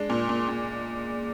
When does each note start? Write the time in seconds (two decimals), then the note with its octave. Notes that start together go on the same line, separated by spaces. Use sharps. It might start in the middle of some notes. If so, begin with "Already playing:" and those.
Already playing: G#3 D4
0.10 A#2
0.29 A#2
0.48 A#2